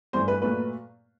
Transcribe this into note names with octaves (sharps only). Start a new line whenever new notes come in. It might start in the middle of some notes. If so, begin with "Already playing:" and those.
G2 E3 A3 C5
B4
A#2 F#3 A3 B4